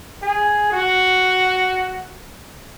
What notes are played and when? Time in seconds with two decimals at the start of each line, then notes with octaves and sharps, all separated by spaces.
0.22 G#4
0.72 F#4